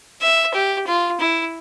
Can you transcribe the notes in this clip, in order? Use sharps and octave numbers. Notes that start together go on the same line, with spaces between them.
E5
G4
F4
E4